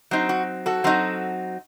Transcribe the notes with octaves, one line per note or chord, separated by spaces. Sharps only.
F#3 C4 D#4
F#4
F#4 A4
F#3 C4 D#4